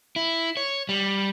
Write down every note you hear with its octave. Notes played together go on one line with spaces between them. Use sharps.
E4
C#5
G3